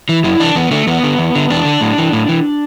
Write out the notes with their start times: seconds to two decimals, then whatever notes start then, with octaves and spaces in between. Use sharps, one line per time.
0.09 E3
0.24 F#2 E4
0.39 E3 D4
0.55 E2 B3
0.71 D3 A3
0.87 E2 B3
1.03 D3
1.19 E2
1.35 D3
1.50 E2 D4
1.65 D3
1.81 A2
1.98 E3
2.13 A2
2.29 E3